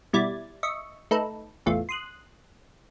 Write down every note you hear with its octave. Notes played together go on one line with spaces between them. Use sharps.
B2 G3 E4 D5 G#6 A6
D#5 E5 C#6
A3 D#4 A4 B4
A1 E2 A3 F4
C6 D#6 F#6